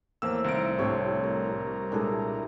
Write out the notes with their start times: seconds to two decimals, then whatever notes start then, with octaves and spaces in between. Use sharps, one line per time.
0.22 E2 A2 F3 A#3 E6
0.44 C2 D#3 F5 A#5 D7
0.79 A2 C3 G3 D4 G4 C#5
1.24 G3 A#4
1.92 A#2 G#3 D4 E4 G#4 A4